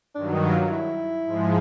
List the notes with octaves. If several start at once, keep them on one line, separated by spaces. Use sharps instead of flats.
G2 D#3 F#3 D4
D#4
F4
E4
G#2 F3 G#3